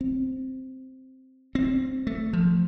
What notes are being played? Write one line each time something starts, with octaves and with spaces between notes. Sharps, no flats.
C4
C4
A3
F3